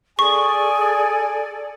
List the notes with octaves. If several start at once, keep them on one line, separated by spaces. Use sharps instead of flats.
G#4 A4 D5 G#5 C#6